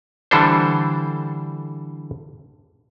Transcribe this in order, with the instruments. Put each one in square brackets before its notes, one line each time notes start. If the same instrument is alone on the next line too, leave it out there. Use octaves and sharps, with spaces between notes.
[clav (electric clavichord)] D3 E3 G3 D4 A4 C5